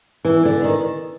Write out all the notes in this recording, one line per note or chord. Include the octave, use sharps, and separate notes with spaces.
E3
D3
D#3